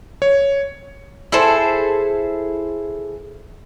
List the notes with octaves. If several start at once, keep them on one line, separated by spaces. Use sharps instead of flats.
C#5
E4 G#4 A4 C5